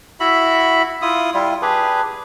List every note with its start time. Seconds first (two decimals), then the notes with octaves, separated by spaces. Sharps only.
0.20 E4 F#4 E5 B5
1.02 E4 F4 D#6
1.34 G3 E4 F4
1.62 D4 G4 G#4 B4